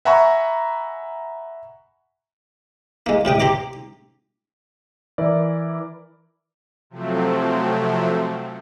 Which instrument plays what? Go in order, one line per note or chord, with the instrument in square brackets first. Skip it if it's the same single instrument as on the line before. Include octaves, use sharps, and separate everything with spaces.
[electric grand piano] E5 F#5 G#5 A#5 B5 C#6
[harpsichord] G#3 A#3
A2 C3 G5 D#6
G4 C5 A#5 D6
[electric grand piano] E3 E4 A#4 D5
[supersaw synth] C3 F3 F#3 A3 C4